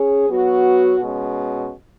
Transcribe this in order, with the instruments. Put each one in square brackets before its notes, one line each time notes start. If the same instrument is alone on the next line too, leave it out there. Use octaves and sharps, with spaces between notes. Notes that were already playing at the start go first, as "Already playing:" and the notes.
Already playing: [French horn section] C#4 G#4
F#3 B3 F#4
B2 G#3 C#4